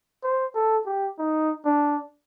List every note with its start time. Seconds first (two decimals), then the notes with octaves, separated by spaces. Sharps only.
0.24 C5
0.55 A4
0.86 G4
1.18 D#4
1.65 D4